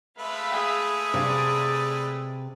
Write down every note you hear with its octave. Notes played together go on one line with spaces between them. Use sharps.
G#3 A3 B4 E5 F5 B5
G#4
C3 D5 F5